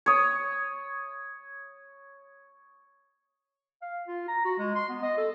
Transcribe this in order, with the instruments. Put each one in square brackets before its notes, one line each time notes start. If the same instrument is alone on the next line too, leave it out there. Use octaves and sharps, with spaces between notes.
[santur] C#5 D#6
[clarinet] F5
F4
A#5
F#4
G#3
C6
B3
D#5
A4